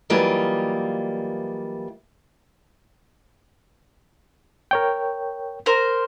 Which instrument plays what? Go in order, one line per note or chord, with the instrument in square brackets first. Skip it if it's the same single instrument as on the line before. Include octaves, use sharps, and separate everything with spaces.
[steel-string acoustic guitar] E3 F#3 G3 A#3 F4 D#5
[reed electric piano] A#4 C#5 G5
[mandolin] A#4 C5